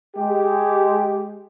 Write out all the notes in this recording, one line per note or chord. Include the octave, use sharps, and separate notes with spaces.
G#3 G4